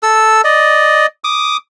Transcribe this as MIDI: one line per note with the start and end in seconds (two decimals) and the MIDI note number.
0.03 0.42 69
0.03 0.42 88
0.44 1.06 74
0.44 1.06 75
1.24 1.57 86
1.24 1.57 87